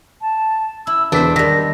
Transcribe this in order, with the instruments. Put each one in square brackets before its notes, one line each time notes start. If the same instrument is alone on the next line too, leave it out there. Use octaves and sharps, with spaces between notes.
[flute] A5
[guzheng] E4 [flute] E6
[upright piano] E1 B3 B6 [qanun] D4 C5 [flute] E6
[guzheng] D#3 G3 [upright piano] A#4 B6 [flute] A#6